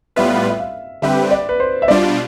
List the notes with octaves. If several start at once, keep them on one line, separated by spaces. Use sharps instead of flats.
A2 G3 B3 F4 B4 E5
E5
F5
D3 G3 C4 G4 B4 E5
D5
B4
C5
E5
B2 G3 D4 F4 D5